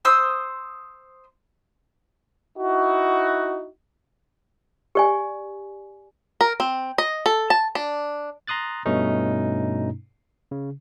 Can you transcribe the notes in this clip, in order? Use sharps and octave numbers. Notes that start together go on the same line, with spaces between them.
C5 C6 D#6 E6
D#4 E4 F#4
G4 D5 G#5
A#4
C4
D#5
A4
A5
D4
A#5 C6 D#6 F#6 A6
G2 B2 A3 C#4 D#4
C#3